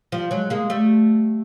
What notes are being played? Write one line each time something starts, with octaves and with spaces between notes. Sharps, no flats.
F3 G3
F#3 G#3
G#3 A#3
G3 A3